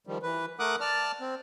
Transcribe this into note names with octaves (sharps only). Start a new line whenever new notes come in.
D#3 F3 G3
E3 B4
A3 A#4 F#5 D6 D#6 F#6
D5 A5 F6
C4